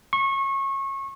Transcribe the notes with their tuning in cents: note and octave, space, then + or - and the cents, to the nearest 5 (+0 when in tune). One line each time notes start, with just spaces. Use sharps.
C#6 -25